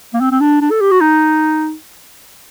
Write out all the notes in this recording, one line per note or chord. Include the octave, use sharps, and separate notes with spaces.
A#3
C4
C4
D4
D4
A4
G4
F#4
D#4